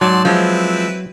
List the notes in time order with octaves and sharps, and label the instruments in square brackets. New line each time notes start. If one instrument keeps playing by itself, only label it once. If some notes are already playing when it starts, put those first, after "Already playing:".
[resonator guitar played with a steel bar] G#2 [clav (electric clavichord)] F#3 [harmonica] D5 A5 C6
[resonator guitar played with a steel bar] F3 G#3 [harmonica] C4 E4 B4